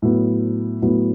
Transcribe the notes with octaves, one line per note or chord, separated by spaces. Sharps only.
A2 F#3 B3
A2 F#3 B3